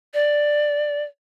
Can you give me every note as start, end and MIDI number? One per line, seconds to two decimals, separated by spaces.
0.14 1.03 74